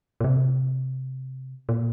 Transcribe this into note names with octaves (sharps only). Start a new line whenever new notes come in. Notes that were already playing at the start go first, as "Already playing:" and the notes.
A#2
C3
A#2